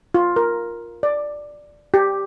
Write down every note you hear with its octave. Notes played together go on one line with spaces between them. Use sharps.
F4
A#4
D5
G4